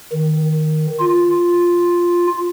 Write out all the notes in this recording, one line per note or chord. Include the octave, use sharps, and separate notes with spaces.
D#3
F4